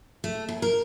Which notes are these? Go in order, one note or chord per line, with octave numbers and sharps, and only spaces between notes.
A3
D#2
A#4